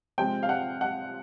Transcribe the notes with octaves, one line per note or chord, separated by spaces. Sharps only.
C3 F3 G#3 C4 G5
F5
F#5
F#5